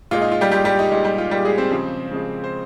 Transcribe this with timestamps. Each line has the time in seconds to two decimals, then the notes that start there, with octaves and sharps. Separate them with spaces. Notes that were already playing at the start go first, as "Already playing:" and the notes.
0.11 A#2 G#3 F4
0.22 D#4
0.32 F4
0.41 G3 G4
0.52 A#2 G3 G#3 G4
0.65 G3 G4
0.79 D#4
0.91 A#2 G#3 D#4
1.04 G3 G4
1.18 F4
1.31 A#2 G3 G#3 G4
1.45 G#3 G#4
1.58 C4 C5
1.71 C#3 F3 G#3
2.11 C#3 F3 G#3
2.44 C5